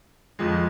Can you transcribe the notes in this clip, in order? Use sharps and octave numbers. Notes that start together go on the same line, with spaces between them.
F2 F3 G#3